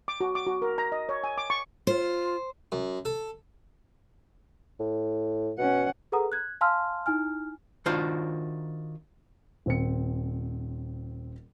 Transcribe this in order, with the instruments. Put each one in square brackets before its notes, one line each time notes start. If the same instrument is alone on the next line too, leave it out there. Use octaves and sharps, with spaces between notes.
[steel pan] D6
F#4
D6
F#4
A#4
A#5
D#5
C#5
G#5
D6
C#6
[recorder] F4 [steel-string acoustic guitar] C5
[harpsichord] F#2
A4
[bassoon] A2
[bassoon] B2 [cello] C#4 F#5
[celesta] G#4 A4 B4 F#5 A#5 D#6
F#6 G#6
F5 G#5 A5 C6 E6 F6
D#4 E4 G#5 F6
[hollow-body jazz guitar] D#3 D4 F4 F#4 C5
[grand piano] D#1 C4 C#7